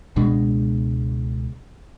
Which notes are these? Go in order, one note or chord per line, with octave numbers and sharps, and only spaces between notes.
C#2 B2 G#3 D4